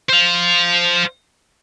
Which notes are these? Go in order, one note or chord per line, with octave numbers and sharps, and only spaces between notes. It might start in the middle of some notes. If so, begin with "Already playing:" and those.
C5 F5